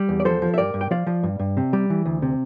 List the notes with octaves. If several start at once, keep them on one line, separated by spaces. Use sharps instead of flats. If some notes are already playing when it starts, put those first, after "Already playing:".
Already playing: G3
E2
D5
F3 A4 C5
F3
E5
G2 A#4 D5
G2
G5
F3 D5 F5
F3
G2
G2
C3
G3
E3
D2
C3